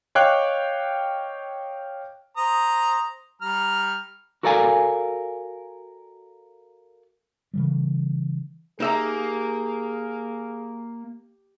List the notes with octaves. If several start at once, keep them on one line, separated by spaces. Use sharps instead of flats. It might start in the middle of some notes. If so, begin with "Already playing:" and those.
C#5 D#5 F5 G5 D6 F#6
C5 A#5 D#6
G3 A#5 F6
F#4 A4 A#4 D5 F5 G#5
C#3 E3 G3
A#3 D#4 G4 G#4 E5 A#5